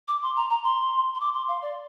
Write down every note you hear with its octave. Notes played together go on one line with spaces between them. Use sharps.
D6
C6
A#5
A#5
C6
C6
D6
C6
F5
D5